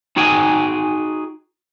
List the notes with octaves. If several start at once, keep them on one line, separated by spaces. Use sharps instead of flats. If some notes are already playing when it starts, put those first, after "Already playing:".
D#4 F#4 G#4 G5 G#5